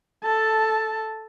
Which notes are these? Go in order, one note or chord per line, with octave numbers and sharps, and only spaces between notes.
A4 A5